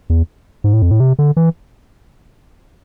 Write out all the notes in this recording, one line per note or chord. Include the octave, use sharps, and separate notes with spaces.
E2
G#2
A2
F2
A2
C3
D3
E3